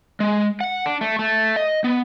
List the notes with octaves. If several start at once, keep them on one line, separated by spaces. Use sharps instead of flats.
G#3
F#5
D4
A3
A3
D#5
B3